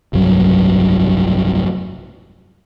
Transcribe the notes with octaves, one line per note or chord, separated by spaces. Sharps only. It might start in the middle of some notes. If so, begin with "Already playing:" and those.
F1 B1 G2 F#3